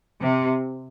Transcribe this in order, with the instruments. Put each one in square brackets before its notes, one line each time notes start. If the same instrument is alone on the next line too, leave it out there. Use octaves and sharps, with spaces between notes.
[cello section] C3